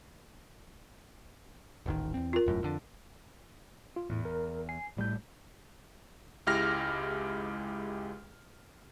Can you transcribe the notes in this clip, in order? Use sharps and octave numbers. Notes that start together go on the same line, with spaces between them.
D#1 A1 D#3
E2 C4
F4 A#4
E1 F#2 A2
F2 D3
F4
E2 A2
A#4
G#5 C7
A#1 A2 G3 A3 G6
C#2 G#3 E4 G4 F6 A#6